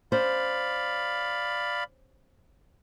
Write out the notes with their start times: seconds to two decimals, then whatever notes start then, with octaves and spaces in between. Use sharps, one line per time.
0.12 C#4 C5 D5 F5 B5